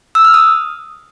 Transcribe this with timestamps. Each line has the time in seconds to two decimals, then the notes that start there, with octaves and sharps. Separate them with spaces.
0.15 E6
0.25 F6
0.34 D#6